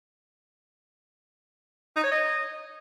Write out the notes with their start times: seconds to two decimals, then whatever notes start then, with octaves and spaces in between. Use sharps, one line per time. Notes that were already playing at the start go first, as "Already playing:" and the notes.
1.96 D#4
2.04 C#5
2.11 D#5